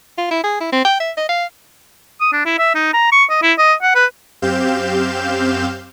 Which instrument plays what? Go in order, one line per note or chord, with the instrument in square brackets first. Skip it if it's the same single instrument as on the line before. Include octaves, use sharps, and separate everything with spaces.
[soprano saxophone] F4
E4
G#4
E4
C4
G5
E5
D#5
F5
[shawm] D#6
D4
E4
E5
D#4
A#5
C#6
D#5
E4
D#5
F#5
B4
[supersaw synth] F#2 C4 G4 F5 G6 E7